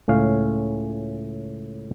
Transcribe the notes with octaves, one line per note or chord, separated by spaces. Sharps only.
C#2 A2 C#4 F5